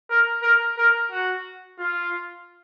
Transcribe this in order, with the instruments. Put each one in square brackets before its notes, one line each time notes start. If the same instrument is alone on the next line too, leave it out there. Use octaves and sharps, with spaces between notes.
[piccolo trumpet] A#4
A#4
A#4
F#4
F4